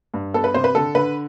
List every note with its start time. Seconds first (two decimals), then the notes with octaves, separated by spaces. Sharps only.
0.14 G2
0.34 B3 A4
0.44 B4
0.54 C3 C5
0.64 B4
0.75 D3 A4
0.95 D3 B4